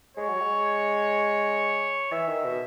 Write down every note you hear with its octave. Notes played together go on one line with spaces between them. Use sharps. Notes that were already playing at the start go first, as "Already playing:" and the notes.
G#3 C#5
F#3
G#3
E3 E5
D#3
B2